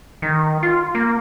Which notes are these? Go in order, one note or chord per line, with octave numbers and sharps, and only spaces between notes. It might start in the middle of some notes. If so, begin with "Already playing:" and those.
D#3
F4
A#3